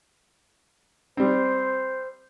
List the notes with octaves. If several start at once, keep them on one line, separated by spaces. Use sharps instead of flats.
G3 C4 C5